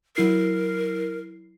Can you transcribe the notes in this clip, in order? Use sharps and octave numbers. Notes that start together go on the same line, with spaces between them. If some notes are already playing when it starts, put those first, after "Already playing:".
F#3 E4 A#4 C7